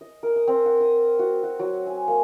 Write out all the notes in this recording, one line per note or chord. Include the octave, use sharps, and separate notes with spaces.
D#5
A#4
D#6
C4
F#5
D#6
F#4
F#4
F#3
G#5
A#3